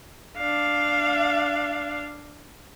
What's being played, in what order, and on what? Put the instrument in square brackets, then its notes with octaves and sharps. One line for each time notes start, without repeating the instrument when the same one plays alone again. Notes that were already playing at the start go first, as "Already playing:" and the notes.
[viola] D4 F5